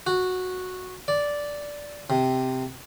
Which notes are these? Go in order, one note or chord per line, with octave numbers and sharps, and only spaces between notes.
F#4
D5
C3